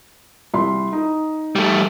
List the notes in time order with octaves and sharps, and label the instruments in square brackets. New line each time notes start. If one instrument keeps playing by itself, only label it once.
[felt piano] C2 B5 C6
D#4
[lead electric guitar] G3 A3